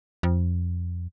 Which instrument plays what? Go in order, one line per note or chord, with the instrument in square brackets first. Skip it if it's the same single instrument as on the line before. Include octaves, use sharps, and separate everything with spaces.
[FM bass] F2